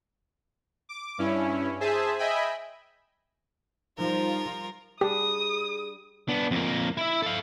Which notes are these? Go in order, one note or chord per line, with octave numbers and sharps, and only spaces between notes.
D6
G2 C#4 E4
G#4 C5 E5 G#5 A5
D#5 E5 G5 G#5 B5
F3 G3 D#4 F4 A#4
G3 D4 G4 G#4 D#6
B3 D4
F2 A#3
E4 E5
A4 F5